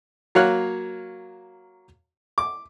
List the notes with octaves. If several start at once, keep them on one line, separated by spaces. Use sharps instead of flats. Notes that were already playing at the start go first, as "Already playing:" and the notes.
F#3 A#3 C#5 F5 F6 F#6
D6